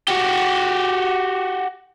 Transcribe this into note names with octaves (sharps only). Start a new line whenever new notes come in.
F#4 G4